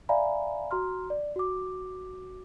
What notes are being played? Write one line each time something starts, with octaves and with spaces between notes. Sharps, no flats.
D5 E5 F5 G#5 A#5 B5
F#4 A#5 C6 F6
D5
F#4 D6